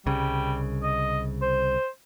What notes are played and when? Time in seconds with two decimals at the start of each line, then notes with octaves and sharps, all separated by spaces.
0.06 C2 C#3 G3
0.83 D#5
1.42 C5